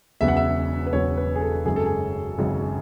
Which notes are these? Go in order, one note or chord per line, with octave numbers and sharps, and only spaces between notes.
E1 E2 C#3 F#3 B3 E5
F#5
E5
B4
E1 E2 C#3 F#3 B3 C#5
B4
G#4
A4
G#1 F#2 C#3 G#3 G#4
A4
G#4
G#1 F#2 C#3 G#3